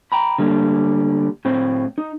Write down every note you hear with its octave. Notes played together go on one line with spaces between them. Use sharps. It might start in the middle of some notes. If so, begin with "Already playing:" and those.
G5 A#5 B5
D3 G3 A#3
A2 C4 C5
D#4